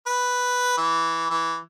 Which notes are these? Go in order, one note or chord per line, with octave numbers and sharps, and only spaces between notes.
B4
E3
E3